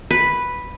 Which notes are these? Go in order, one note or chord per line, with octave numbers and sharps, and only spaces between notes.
B4